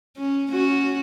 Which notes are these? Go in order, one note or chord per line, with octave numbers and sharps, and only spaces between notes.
C#4
C#4 F#4